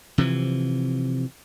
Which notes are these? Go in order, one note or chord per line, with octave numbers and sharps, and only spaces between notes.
C3 E3 F3